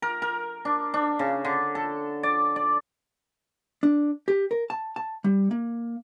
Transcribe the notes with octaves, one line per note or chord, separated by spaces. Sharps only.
A#4
A#4
D4
D4
C#3
D3
A4
D5
D5
D4
G4
A#4
A5
A5
G3
A#3